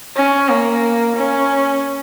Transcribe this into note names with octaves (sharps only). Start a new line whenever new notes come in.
C#4
A#3
C#4